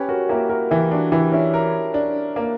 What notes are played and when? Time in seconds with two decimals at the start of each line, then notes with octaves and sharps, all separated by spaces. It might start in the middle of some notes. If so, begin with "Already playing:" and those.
Already playing: C#4 G4 B4
0.09 F#4 A#4
0.29 A#3 E4 G4
0.50 F#4 A#4
0.71 E3 E4 G4
0.91 D4 F#4
1.12 E3 E4 G4
1.32 C#4 E4
1.54 A#4
1.94 D4
2.36 A#3